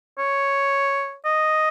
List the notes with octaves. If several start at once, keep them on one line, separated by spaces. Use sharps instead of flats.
C#5
D#5